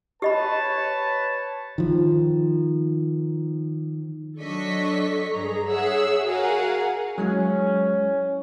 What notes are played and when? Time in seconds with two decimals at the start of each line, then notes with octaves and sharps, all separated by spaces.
0.22 G4 B4 C#5 D#5 A5 B5
1.78 D#3 F3
4.40 F#3 D4 A4 D#5 C#6 B6
5.34 G2 G#4 A#5
5.68 G#4 C#5 E5 F#5 E6
6.26 F#4 G#4 A#4 F5 F#5 G#5
7.18 F#3 G#3 C#4 E4